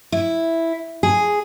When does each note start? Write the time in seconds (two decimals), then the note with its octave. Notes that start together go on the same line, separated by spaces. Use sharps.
0.12 E4
1.03 G#4